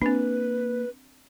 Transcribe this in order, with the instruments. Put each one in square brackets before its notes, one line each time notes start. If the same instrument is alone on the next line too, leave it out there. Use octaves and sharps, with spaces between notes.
[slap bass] A#3 [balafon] C4 D4 [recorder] B4